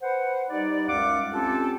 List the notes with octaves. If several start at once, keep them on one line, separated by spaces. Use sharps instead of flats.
B4 C5 F#5
G3 D#4 G4 D5
C#2 F#2 F5 F#5 D6
C4 C#4 F4 G4 A4